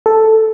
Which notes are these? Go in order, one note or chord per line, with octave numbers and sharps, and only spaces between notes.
A4